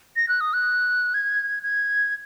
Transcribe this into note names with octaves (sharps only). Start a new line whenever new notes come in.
A#6
F#6
D#6
F#6
G#6
G#6